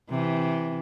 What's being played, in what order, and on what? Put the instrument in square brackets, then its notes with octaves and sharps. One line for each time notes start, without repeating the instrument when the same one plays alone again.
[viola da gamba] C3 E3